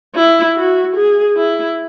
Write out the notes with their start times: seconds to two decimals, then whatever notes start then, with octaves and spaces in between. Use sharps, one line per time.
0.16 E4
0.56 F#4
0.96 G#4
1.36 E4